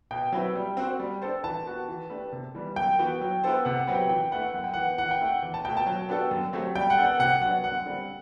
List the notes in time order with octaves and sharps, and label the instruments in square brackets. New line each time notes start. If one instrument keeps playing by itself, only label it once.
[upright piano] B2 [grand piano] G5
[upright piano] F#3 C4 E4 B4
G3
C4 F#4 C5
G3
D4 A4 C5
[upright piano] E3 [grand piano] A5
[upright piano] B3 F#4
E3
A3 D4 G4 B4
C3
E3 G3
[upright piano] F#2 [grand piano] G5
[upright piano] E3 B3 F#4
F#3
B3 E4 A4 C5
[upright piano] C3 [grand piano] F#5
[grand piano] F#5
[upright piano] F#3 C4 G4 B4
[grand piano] G5
[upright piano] E3 [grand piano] G5
[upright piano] A3 E4 B4 [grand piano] F#5
[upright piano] F#2 [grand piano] F#5
[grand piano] G5
[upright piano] E3 B3 [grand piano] F#5
[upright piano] E3 [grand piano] F#5
[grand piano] G5
[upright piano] A3 E4 [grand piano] F#5
[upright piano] E2
[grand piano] A5
[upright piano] B2 A3 [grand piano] G5
[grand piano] A5
[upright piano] F#3
B3 D4 F#4 A4
F#2
F#3 A3 C4 G4
[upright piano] G3 [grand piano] G5
[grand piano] F#5
[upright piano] B3 D4 A4
[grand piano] F#5
[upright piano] C3 [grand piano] F#5
[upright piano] F#3 B3 D4 [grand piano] F#5
[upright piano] F#2 [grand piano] F#5
[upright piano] D3 G3 C4